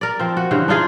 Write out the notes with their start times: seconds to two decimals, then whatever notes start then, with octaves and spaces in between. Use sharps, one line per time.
0.01 A#4 D5
0.19 F3 C4
0.37 F#4
0.51 G2 C#3 E3 C5
0.68 D4 D#4 F4 G#4